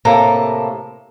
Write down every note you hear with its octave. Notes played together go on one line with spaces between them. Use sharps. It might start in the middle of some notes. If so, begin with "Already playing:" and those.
A2 C3 A#3 A4 A#5